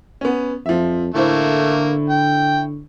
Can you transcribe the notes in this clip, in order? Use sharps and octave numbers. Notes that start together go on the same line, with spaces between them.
B3 C#4
F2 F3 E5
A2 D3 A3 A#3 E4 C5
G5